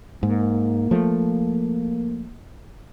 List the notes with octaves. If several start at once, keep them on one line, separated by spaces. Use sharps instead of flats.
G#2 A#3
F3 A3